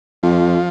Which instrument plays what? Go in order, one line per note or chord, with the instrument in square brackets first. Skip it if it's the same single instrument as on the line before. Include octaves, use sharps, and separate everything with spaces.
[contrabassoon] F2 [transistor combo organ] F3